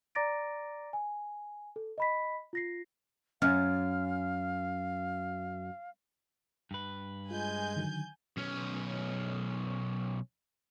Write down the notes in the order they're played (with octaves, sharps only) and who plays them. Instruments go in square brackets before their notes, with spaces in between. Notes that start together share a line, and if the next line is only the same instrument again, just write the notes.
[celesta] D5 A#5 D6 A6 A#6 D7
G#5
A4
D#5 B5 B6
F4 A#6 C7
[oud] F#2 [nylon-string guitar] C#4 [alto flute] F5 [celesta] F6
[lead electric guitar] G2 B4
[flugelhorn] G#3 [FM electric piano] F4 [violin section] G#5 G6
[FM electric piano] D3 D#3 F#3
[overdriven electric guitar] B1 C#4